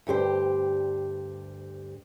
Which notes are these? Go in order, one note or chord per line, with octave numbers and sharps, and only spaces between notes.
D2 G2 G4 C5